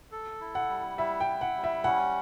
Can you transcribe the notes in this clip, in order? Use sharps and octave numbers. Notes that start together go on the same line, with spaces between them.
A4
E4
F#5
G3
E4 E5
G5
E4
F#5
G3
E5
C#4 F#5